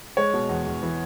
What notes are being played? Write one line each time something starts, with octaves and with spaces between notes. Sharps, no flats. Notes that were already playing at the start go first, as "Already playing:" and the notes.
G#3 C#5
B2
E2
E2
E3